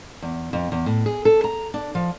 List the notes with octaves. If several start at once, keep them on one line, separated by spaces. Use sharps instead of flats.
E2
F2
E2
A2
G#4
A4
A#5
D4
F3